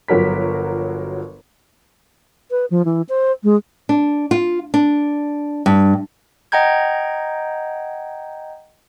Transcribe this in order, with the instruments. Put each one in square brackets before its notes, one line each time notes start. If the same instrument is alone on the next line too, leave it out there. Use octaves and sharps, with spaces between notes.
[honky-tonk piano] G1 F3 F#3 A#4 B6
[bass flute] B4
F3
E3
C5
G#3
[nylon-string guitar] D4
F4
D4
G2
[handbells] D#5 F#5 G5 A#5 G6 G#6